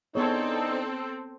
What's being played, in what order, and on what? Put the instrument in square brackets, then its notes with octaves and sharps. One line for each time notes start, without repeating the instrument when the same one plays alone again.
[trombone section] E3 D4 D#4 [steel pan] B3 G#4 C#5 [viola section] C4 A4